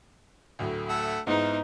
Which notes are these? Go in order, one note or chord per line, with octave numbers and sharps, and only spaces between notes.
D2 A2 F#3
A3 F#5 E6
G#2 B3 D#4 E4 C5